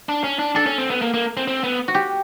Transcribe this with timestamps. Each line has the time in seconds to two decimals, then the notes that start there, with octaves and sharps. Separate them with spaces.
0.09 D4
0.24 C#4
0.39 D4
0.55 D4 A4
0.66 C#4
0.78 C4
0.90 B3
1.02 A#3
1.14 A#3
1.37 C4
1.48 C4
1.64 B3
1.88 F#4
1.95 G4